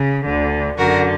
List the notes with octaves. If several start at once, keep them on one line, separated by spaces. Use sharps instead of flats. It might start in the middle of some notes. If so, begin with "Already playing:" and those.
Already playing: C#3
D2 D3
F#2 D3 F#4 A#4